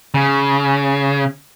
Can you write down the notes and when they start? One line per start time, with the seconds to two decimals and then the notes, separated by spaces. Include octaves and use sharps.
0.14 C#3